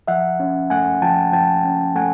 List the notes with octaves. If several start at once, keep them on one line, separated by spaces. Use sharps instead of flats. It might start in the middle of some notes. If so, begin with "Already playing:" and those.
F3 E5 F#5
C#4
A3 F#5 G#5
F3 G5 A5
F3 G5 A5
C#4
A3 F#5 G#5